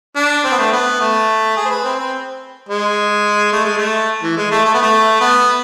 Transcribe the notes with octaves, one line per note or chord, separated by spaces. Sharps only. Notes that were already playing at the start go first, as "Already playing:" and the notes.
D4
C4
B3
A3
B3
A3
G#4
C5
B4
C4
C4
G#3
A3
G#3
A3
E3
G#3
A3
A3
B3
A3
B3